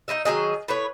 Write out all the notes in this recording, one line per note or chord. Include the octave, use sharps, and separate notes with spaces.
D#4 E4 D#5 E5
D#3 F#3 G#4 D#5
A2 B4 C#5